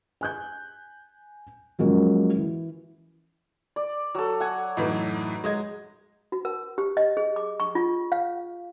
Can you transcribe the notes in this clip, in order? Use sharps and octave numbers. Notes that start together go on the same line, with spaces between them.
G#5 F#6 G6
F3 F#3 G#3 A#3 C#4
E3
D5
F#3 A4
F#5 G#5
F#2 A2 E3 D#4
G#3 D#5 G#6
F#4
A#4
G4
D#5
G#4
D6
C#6
F4
F5